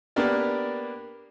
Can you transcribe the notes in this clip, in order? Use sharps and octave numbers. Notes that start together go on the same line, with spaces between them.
A#3 B3 D4 G4 A#4 D5